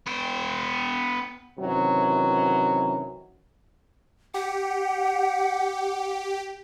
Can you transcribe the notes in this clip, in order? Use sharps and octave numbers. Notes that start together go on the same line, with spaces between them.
B3 G5
F#2 C3 D#3 E3 F#3
G4 F#5